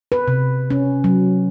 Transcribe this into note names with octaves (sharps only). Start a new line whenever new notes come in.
B4
C3
C#4
F#3